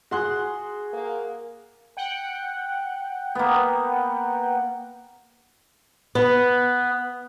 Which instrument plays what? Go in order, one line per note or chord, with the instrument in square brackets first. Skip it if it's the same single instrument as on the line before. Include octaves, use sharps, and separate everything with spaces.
[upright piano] F#4 C6 F#6 [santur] G#4 F#5
[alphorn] A#3
[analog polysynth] F#5 G5
[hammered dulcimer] A#3 B3
[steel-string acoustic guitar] B3